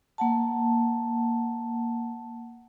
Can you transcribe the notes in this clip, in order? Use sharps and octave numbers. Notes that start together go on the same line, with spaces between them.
A#3 F#5 A5